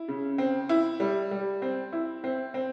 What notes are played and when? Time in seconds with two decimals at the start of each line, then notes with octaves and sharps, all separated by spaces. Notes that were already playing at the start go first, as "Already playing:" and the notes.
Already playing: E4
0.08 C#3
0.38 C4
0.69 E4
1.00 G3
1.31 G3
1.62 C4
1.93 E4
2.24 C4
2.54 C4